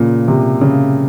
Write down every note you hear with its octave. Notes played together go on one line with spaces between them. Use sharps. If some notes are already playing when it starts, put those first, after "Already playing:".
Already playing: A#2 C#3
C3
C#3